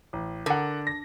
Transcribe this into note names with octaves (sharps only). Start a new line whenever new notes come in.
A1
D3 A#4 F#5
A#6